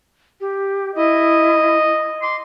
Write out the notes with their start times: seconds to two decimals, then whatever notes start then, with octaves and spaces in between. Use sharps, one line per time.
0.40 G4
0.96 E4 D#5
2.22 C6 D6